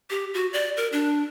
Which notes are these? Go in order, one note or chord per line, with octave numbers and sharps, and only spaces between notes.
G4
F#4
D5
A#4
D4